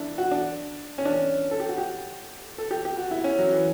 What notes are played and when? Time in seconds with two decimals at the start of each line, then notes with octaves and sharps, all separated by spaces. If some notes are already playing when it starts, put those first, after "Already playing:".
Already playing: D4 E4
0.18 F#4
0.32 D4
0.98 C#4
1.05 D4
1.13 C#4
1.51 A4
1.60 G4
1.69 F#4
1.78 G4
2.58 A4
2.71 G4
2.85 G4
2.97 F#4
3.11 E4
3.24 C#4
3.39 F#3
3.51 E3